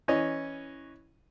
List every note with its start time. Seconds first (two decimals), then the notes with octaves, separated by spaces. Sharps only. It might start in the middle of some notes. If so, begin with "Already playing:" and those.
0.08 E3 C#4 D#5